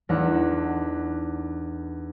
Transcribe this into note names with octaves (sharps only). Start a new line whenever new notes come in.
E2 A3 D4 D#4 F#5 B6